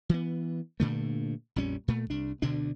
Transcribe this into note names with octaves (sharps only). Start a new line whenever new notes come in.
E3 B3
G2 A#2 D3 A3
A#1 F2 G3 C#4
A#2 A3
C2 D4
D2 B2 D3 D4